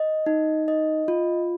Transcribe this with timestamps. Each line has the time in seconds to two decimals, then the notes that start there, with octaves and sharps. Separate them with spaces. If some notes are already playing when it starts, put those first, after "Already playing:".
Already playing: D#5
0.26 D#4
0.68 D#5
1.08 F4